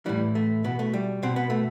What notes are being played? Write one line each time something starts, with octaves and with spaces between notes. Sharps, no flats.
A2 E3 G3
A3
B2 B3
A3
G3
B2 C4
B3
A3